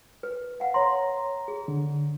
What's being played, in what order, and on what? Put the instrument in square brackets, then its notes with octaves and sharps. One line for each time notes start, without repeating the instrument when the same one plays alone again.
[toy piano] B4
F5 F#5
[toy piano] C#5 C6 [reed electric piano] A#5
[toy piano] G#4
[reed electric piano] D3